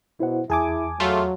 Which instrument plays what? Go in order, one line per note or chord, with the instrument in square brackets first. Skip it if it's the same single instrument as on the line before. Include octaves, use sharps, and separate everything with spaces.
[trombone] B2 [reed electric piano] E4 C5 F#5
[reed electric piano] E2 A5 D#6 [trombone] E4 [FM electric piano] G#4 G#5 D6
[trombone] F#3 [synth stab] A3 F4